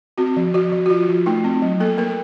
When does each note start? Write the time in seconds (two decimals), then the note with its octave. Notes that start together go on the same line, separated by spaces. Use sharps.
0.18 C4 F#4
0.37 F3
0.54 F3 F#4
0.72 F3
0.86 F#4
0.90 F3 F4
1.08 F3
1.26 A3 D#4
1.44 C4
1.62 F#3
1.80 A#3 A4
1.98 A#3 A#4